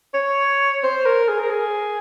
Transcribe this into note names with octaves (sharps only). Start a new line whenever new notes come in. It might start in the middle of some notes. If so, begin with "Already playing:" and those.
C#5
C5
A#4
G#4
A#4
G#4